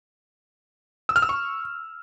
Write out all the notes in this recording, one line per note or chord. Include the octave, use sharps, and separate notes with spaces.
E6
F6
E6
C#6